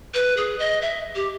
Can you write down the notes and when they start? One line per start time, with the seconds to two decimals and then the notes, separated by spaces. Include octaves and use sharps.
0.14 B4
0.37 G#4
0.59 D#5
0.82 E5
1.15 G4